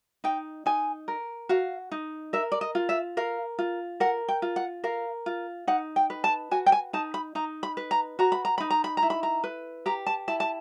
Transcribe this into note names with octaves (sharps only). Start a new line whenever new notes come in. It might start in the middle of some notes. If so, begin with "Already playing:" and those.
D#4 G5
D#4 G#5
A#4
F#4 F5
D#4
A#4 E5
D5
D#5
F4
E5
A#4 F5
F4
A#4 F#5
G5
F4
F#5
A#4 F5
F4
D#4 F#5
G5
B4
A5
F#4 G#5
G5
G#5
D#4 A5
B5
D#4 A#5
B5
B4
A#5
F#4 A#5
B5
A#5
D#4 B5
A#5
B5
A#5
E4
B5
A#5
B4
G4 A#5
A5
E4 A5
A5